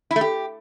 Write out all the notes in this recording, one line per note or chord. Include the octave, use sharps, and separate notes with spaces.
E4
A3
G4